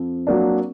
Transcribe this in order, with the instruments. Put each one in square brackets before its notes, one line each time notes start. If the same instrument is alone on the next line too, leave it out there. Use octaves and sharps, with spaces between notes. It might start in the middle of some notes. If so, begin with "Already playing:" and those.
Already playing: [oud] F2
[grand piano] F#3 A#3 D4